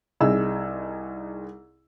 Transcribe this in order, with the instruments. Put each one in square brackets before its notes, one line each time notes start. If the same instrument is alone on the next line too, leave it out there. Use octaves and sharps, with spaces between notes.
[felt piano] C2 D#4 G#4 E6